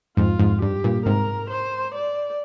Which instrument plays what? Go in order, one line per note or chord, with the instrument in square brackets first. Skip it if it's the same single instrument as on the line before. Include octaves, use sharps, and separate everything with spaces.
[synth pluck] F2 G#2 [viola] F4
[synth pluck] F2 G#2
[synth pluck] G2 [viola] G4
[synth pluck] G2 A#2
[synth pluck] G#2 C3 [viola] A#4
[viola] C5
D5